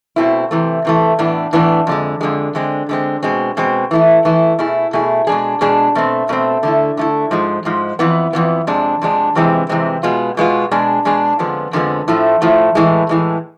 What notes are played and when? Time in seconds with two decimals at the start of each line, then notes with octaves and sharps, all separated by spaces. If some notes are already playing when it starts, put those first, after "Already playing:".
0.16 B2 A3 C4 E4
0.51 C3 E3 A3
0.85 C3 E3 A3
1.19 A2 E3 B3 D4
1.53 A2 E3 B3 D4
1.87 F2 D3 G#3
2.21 F2 D3 G#3
2.55 D3 G#3 C4
2.89 D3 G#3 C4
3.23 B2 G#3 C4
3.57 B2 G#3 C4
3.91 E3 A3 E4
4.25 E3 A3 E4
4.59 B2 A3 E4 G#4
4.93 B2 A3 E4 G#4
5.27 B2 G#3 D4 G#4
5.61 B2 G#3 D4 G#4
5.95 B2 A3 C4
6.29 B2 A3 C4
6.63 D3 A3 E4
6.97 D3 A3 E4
7.31 G#2 F3 G#3
7.65 G#2 F3 G#3
7.99 F2 E3 B3
8.33 F2 E3 B3
8.67 F2 C3 G#3 D4
9.01 F2 C3 G#3 D4
9.35 F2 C3 E3 G#3 C4
9.69 F2 C3 E3 G#3 C4
10.03 B2 G#3 B3 F4
10.37 B2 G#3 B3 F4
10.71 B2 G#3 D4 G#4
11.05 B2 G#3 D4 G#4
11.39 F2 D3 F3 G#3 B3
11.73 F2 D3 F3 G#3 B3
12.08 A2 F3 A3
12.42 A2 F3 A3
12.75 A2 E3 G#3
13.09 A2 E3 G#3